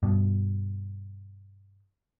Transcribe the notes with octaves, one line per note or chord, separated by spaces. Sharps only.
G2 B2